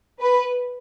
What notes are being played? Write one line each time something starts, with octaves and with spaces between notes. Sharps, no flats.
B4